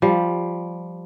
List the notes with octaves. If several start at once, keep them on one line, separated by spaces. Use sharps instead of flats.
F3 G3